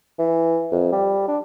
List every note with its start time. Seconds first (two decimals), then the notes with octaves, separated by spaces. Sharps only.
0.19 E3
0.72 F2
0.92 G3
1.28 D4